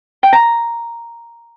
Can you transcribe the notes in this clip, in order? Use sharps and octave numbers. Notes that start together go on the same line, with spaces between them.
G5
A#5